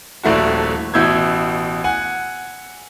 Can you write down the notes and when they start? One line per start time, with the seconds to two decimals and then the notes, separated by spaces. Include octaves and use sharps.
0.23 D#1 A#1 A3 E4 F#4
0.94 A1 B2 E4 E6 G6 G#6
1.84 F#5 G#5